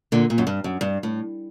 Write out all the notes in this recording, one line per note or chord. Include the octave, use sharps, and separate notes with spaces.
A#2 D3
A#2
F#2
G2
F#2
G2
A2